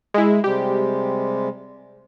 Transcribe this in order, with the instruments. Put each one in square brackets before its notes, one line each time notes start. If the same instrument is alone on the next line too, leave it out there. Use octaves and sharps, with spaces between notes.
[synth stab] G#3 E4
[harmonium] C3 G3 G#3 [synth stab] G4